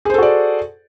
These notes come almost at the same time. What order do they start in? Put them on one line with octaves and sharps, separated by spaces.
G#4 C5 A4 F#4 D5